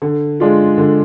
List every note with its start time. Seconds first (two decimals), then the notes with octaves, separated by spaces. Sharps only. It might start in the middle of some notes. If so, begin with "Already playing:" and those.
0.02 D3
0.40 G#3 D4 F4
0.78 D3